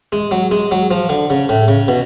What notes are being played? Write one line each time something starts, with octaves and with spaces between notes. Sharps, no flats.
G#3
F#3
G#3
F#3
F3
D3
C#3
A2
C#3
B2